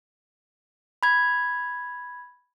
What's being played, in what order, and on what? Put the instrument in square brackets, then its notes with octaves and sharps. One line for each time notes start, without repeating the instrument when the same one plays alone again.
[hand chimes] B5 G#6